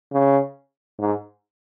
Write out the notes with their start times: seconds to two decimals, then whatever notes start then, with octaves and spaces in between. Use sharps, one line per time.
0.12 C#3
1.00 G#2